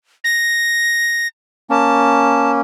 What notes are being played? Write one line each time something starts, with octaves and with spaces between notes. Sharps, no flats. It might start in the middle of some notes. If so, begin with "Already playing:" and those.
A#6
A#3 C#4 A5